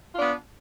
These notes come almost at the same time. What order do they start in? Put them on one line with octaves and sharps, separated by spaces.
F4 D4 B3